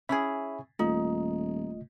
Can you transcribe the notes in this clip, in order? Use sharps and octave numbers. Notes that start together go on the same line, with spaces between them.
C#4 E4 G#4 E5 B5
D#1 A3 D#4 F4 D#5